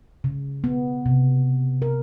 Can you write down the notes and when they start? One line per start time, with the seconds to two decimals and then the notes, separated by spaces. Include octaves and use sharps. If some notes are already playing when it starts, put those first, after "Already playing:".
0.24 C#3
0.64 B3
1.06 C3
1.82 A#4